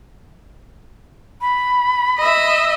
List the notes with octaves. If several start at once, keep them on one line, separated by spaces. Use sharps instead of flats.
B5
D#5 E5